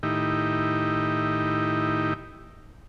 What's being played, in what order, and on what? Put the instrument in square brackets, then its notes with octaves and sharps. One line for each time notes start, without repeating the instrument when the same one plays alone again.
[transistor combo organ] A2 D#3 D#4 E4 G4